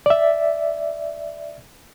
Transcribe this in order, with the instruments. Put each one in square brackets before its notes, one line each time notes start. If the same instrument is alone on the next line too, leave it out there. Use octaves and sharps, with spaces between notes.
[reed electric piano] D5 E5